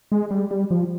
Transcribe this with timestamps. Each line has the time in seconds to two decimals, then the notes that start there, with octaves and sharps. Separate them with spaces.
0.12 G#3
0.31 G3
0.51 G3
0.71 F3